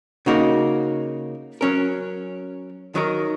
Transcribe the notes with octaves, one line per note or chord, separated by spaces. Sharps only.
C#3 A#3 D#4 F#4
F#3 C#4 A#4
D#3 F#3 D#4 A#4